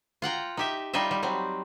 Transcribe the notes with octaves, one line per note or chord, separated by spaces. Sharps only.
F4 F#5 G5 A#5
D#4 G4 E5
G3 D#4 F4 D#5 E5
G3
F#3 G3 C4